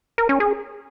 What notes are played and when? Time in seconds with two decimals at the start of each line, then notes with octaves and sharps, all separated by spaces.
0.18 A#4
0.29 C#4
0.40 G#4